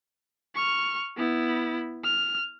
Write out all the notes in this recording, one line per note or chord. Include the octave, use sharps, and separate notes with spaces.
C#6 F6
B3 E4
F6